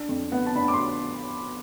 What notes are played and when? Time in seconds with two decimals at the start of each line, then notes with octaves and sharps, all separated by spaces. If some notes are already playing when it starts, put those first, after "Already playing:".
Already playing: D4
0.09 F2
0.32 B3
0.46 A5
0.55 D4 B5
0.68 D6
0.74 C6